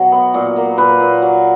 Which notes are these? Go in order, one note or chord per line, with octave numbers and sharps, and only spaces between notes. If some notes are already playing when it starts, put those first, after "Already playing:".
Already playing: B2 F#3
B3
A#2
A#3
A#2 B4
A#2
F#3